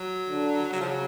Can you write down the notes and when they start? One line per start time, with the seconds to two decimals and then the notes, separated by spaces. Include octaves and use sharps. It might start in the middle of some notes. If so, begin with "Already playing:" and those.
Already playing: F#3
0.29 D3
0.72 C#3 F#3
0.81 F3
0.87 F#3